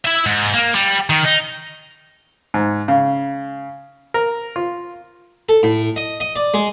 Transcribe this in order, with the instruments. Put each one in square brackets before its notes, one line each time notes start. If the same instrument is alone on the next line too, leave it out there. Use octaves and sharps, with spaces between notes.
[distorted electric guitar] E4 E5
G#2
A#3
G3
D#3
D#4
[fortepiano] G#2
C#3
A#4
F4
[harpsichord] A4
A2
D#5
D#5
D5
G#3